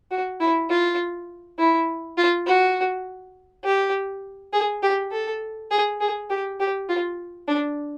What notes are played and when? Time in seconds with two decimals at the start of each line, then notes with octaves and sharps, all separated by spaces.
0.11 F#4
0.40 E4
0.70 F4
1.58 E4
2.17 F4
2.46 F#4
3.64 G4
4.53 G#4
4.83 G4
5.12 A4
5.71 G#4
6.00 G#4
6.30 G4
6.60 G4
6.89 F4
7.48 D4